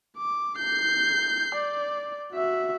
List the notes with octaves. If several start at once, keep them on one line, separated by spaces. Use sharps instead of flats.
D6
G6 C7
D5
F#4 E5